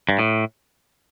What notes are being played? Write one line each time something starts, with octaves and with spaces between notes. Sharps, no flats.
G2
A2